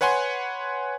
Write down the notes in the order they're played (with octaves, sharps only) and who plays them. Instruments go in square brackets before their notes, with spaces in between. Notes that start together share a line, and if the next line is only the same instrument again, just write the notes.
[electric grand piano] B4 C#5 F#5 G#5 C6